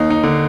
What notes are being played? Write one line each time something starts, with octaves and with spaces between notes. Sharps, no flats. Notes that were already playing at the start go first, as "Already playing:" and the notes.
Already playing: D#2 D#4
D#4
D3